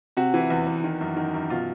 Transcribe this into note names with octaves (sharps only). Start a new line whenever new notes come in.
C3 F#4
E3
E2
E2
D#3
F#2
D#3
F#2
B2 F4